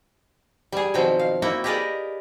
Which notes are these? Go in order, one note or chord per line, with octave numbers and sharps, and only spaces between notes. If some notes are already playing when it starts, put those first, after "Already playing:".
G3 G#4
B2 D#3 F3 F#3 C4 G5
F5
A#3 E4 F#4 G5
G4 G#4 A#4 B4 D5 D#5